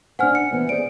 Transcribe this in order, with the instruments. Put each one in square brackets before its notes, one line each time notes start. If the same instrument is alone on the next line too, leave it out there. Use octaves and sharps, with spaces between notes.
[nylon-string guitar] D4 C5 [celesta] F#5 G#5 F6
[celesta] C#7
[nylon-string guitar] E3 B3 C5
[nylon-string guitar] G#4 C5 D5 [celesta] D7